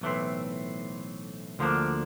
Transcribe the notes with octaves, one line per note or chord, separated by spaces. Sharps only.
B1 A2 E3 A3 C4
D2 D3 F3 A#3 D4